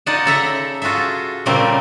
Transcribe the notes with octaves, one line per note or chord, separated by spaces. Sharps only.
D#4 F4 D5 D#5 F#5 A5
C#3 A4 E5 A#5
F4 F#4 G#4 A4 E5
A#2 C#3 G3 A3 A#3 C4